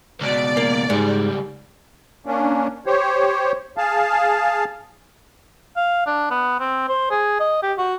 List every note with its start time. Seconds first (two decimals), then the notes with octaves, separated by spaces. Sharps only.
0.21 C#2 B2 D5
0.57 A#3
0.90 C#2 G#2 G3
2.26 A#3 C#4 D4
2.86 G4 C5 C#5
3.77 G#4 F5 A5
5.77 F5
6.07 D4
6.31 B3
6.60 C4
6.89 C5
7.11 G#4
7.40 D#5
7.63 G4
7.78 F#4